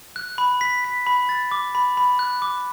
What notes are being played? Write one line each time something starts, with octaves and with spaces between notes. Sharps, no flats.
F#6
B5
B6
B6
B5
A6
D6
B5
B5
F#6
D6